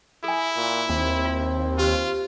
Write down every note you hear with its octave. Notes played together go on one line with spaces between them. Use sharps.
E4 A4 G#5
A#2
D#2 C4
F4
F4 G4 B4 C5